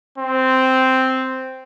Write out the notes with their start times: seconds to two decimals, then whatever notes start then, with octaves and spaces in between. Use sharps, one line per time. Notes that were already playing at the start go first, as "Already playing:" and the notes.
0.18 C4